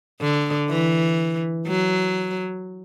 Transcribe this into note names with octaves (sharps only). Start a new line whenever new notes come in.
D3
E3
F#3